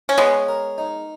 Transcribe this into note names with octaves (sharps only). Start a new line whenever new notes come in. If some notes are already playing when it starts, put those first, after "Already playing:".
C#4
G#3 B3 C#5
A#4
D#4